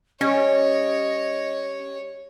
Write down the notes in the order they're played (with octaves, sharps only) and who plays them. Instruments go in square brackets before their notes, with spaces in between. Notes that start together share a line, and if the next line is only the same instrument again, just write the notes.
[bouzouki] G3 [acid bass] C#4 [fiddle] C#5 [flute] D#5